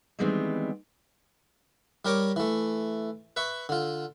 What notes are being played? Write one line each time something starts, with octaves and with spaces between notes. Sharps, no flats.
D#3 E3 G3 G#3 B3 C4
G3 G4 A#4 C#5 D6
E3 A3
B4 E5 C#6
D3 F4